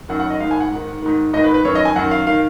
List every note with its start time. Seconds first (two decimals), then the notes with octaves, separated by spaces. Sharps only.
0.09 F#2 D#3 F#5
0.20 F#5
0.30 D#5
0.40 G#2 F5
0.44 D#3
0.51 G#5
0.60 F#5
0.71 G#2 D#3
1.02 G#2 D#3
1.33 G#2 D#5
1.37 D#3
1.44 B4
1.54 B4
1.65 F#2 D#3 C#5
1.75 D#5
1.85 G#5
1.96 F#2 D#3 F#5
2.11 F5
2.27 D#3 F5